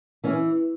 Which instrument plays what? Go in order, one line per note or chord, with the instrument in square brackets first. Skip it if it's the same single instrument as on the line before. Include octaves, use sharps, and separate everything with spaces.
[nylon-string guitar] E3 C#4